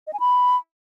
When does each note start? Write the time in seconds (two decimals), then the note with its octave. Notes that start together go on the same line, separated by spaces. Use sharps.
0.07 D#5
0.13 G#5
0.20 B5